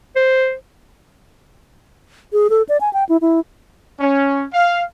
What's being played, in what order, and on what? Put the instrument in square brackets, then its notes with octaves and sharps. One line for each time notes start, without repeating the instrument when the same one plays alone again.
[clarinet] C5
[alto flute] G#4
A4
D5
G#5
G5
E4
E4
[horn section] C#4
F5